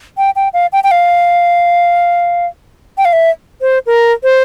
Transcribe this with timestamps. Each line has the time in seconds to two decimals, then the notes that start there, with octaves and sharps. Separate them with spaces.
0.18 G5
0.36 G5
0.54 F5
0.73 G5
0.84 G5
0.91 F5
2.98 G5
3.05 F5
3.13 E5
3.61 C5
3.86 A#4
4.23 C5